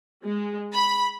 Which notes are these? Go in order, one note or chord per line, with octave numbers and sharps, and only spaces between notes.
G#3
B5